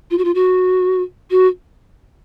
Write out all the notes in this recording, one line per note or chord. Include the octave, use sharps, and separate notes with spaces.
F4
F#4
F4
F#4
F#4